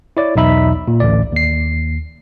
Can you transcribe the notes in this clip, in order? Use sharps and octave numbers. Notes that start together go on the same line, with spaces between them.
E4 C#5 D5
B1 E2 D#4 E5 B5
A#2
A1 D2 D5
D#2 C7